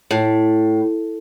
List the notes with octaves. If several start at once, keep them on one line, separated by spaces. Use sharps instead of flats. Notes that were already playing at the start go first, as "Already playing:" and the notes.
A2